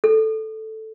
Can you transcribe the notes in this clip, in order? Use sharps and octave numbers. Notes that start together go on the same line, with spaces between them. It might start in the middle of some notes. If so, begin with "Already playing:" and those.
A4